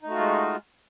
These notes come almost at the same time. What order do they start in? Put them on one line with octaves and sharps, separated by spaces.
D#4 A3 F#4 F4 G#3